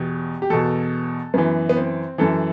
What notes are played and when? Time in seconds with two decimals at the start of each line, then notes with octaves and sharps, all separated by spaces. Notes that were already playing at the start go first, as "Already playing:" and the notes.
Already playing: E2 B2 G4
0.42 G4
0.50 E2 B2 A4
1.34 F#2 E3 B3
1.69 B3
1.77 C4
2.18 F#2 E3 A4